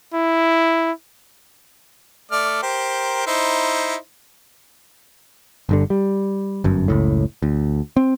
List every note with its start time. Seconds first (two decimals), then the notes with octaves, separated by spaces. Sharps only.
0.14 E4
2.31 A3 D5 F6
2.63 G4 A#4 C5
3.27 D#4 E4 C5
5.69 G1 G2 D3
5.90 G3
6.64 G1 F#2
6.88 F#1 C#2 A2
7.42 D2
7.97 C4